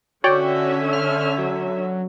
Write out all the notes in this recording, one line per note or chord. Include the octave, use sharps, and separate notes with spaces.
D3 C#4 F#4 C#5 D5 E5 G5
F6
F#3